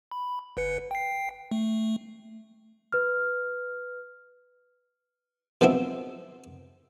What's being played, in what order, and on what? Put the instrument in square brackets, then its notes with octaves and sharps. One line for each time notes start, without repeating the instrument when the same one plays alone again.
[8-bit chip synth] B5
G1 B4 C#7
G5 C7
A3
[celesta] B4 F6
[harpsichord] B2 D#3 F3 F#3 C4 E4